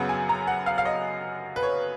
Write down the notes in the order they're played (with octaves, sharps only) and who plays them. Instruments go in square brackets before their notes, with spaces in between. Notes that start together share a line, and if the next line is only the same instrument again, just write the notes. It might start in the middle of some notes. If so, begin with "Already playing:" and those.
Already playing: [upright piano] F#2 C#3 F#3 B3 F#5
G#5
A#5
F#5
F5
F5
D#5
B4
C#5